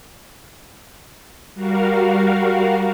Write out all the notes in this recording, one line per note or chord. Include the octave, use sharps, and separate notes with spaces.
G3 F#4 A#4 F5